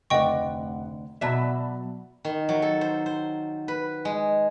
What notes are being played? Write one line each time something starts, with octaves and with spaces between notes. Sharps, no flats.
F1 D2 D5 D#5 F#5 G5 C#6
B2 F#3 D5 E5 A5 B5
D#3
F#3
A4
C5
C5
B4
G#3